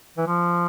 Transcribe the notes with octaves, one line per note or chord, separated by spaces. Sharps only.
E3
F3